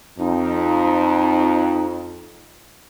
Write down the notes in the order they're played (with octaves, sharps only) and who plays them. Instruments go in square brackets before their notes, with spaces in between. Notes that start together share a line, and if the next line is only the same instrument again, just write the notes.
[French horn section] F2 [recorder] D#4